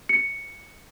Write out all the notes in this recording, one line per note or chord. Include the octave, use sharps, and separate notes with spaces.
C#7